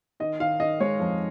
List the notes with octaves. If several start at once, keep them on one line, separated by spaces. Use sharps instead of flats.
D#3 D#5
D#3 F5
D#3 D#5
G#3 C#5
F2